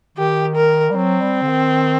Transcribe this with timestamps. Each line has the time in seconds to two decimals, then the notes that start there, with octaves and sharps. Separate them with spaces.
0.17 D#3 G4
0.56 A#4
0.90 G3
0.96 F#3 C4
1.22 G3
1.42 D3
1.48 D#3